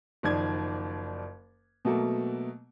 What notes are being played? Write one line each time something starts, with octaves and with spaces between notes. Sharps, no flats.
F#1 D#3 F3 D5 G#6
B2 F#3 A3 A#3